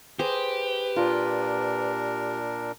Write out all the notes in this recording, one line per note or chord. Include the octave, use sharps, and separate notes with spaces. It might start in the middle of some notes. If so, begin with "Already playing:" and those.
G4 G#4 B4 C5 A#5
A#2 D4 F4 A#4